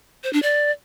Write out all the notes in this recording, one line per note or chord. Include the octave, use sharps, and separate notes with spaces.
C5
D4
D5